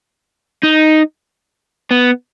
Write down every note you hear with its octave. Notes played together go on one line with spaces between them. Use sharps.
D#4
B3